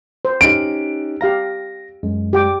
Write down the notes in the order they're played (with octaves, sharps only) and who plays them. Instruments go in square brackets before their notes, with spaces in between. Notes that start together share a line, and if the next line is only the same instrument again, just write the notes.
[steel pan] C5
[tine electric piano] C#4 D#4 G4 [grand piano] D7
[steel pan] G4 F5 A#5 [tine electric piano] A#6
[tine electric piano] F#2 G#3
[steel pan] G4 G5 D6